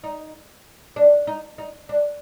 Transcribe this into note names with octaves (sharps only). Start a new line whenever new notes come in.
D#4
D4
D#4
D#4
D4